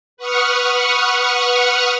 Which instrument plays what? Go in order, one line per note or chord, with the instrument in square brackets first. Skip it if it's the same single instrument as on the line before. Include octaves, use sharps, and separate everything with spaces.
[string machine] B4 F#5 C#6 D#6 F6